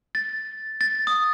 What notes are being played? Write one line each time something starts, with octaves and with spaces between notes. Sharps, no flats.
A6
A6
D#6